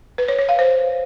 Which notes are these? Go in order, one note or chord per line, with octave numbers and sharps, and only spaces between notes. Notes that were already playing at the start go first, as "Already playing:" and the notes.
B4
C#5
C#5
F5
C5